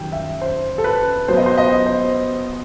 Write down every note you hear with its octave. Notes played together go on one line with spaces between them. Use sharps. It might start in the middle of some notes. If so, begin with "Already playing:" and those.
Already playing: F#2 D#3 G3 G5
E5
C5
A4
B4
B1 B2 F#3 B3 C5
D#5
C5
D#5
C5